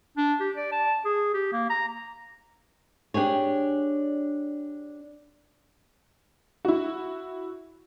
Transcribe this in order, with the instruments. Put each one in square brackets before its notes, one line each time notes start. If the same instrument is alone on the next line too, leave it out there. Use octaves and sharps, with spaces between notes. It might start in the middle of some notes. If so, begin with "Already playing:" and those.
[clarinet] D4
G4
D5
A5
G#4
G4
A#3
A#5
[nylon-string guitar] D4 G4 G#4 C#5
[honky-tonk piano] E4 F#4